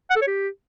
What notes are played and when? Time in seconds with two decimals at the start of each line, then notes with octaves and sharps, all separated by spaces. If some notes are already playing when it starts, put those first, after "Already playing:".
0.10 F#5
0.16 A4
0.22 C#5
0.27 G4